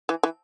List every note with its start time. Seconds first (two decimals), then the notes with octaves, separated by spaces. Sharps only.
0.09 E3
0.23 E3